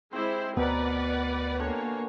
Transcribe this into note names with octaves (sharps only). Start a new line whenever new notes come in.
G#3 C4 E4 G4 C5
D2 B2 B3 G4 A#4 B4 D5 F#5
D3 A#3 G4 C#5 G#5